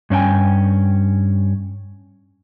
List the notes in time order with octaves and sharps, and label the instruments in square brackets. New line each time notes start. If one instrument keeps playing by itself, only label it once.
[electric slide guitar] G2 C#4 D#4 G5 G#5